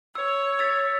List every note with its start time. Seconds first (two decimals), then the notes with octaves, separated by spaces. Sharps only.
0.15 C#5 E6
0.59 E6 A6 B6